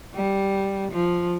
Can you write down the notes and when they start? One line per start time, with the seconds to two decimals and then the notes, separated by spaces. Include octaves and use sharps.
0.15 G3
0.91 F3